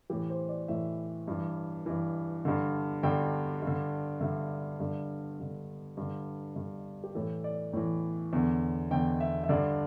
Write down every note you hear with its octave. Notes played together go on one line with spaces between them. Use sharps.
A2 E3 G4
C5
D5
A2 E3 E5
G2 E3
G2 E3
G2 D3
G2 D3 G5
G2
D3
G2 D3 E5
G2 D3
G2 D3
G2 D3
G2 D3
G4
A2 E3 A4
D5
A2 E3
E2 D3
E2 D3 G5
E5
E5
G2 D3 D5